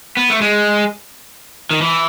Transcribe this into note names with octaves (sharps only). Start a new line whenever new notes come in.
B3
A3
G#3
D#3
E3